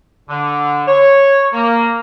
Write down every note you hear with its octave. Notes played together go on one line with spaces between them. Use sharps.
D3
C#5
A#3